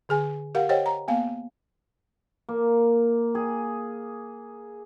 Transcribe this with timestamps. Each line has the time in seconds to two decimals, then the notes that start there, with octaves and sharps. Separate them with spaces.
0.09 D3 G#4 G#5
0.55 G4 A#4 F5 F#5
0.69 G4 C5 C#5 D#5 F#5 G5
0.86 A#5
1.08 A#3 B3 F5
2.49 A#3
3.35 G#4